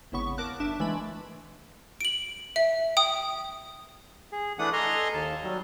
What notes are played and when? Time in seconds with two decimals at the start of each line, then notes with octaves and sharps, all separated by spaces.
0.12 G#1 E2 C#3 B3 C#6
0.38 A#4 A5 D6 F#6
0.60 G1 D4 E5
0.80 E3 G#3 A3 B5
2.01 D7 F#7
2.56 E5
2.97 G5 D#6
4.32 G#4
4.59 E3 A3 D4 F#5 D#6
4.73 A4 D#5 G#5 A#5 C6 F6
5.14 D#2 A5
5.43 F#3 G3